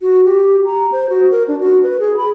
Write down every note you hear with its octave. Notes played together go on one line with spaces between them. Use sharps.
F#4
G4
A#5
C5
F#4
A#4
D4
F#4
B4
G#4
B5